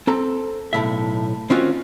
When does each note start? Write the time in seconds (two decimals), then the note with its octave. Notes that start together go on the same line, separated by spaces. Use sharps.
0.07 C4 A4 A#5
0.73 B1 F2 A2 E5
1.50 D#3 C4 C#4 D#4 F4 F#4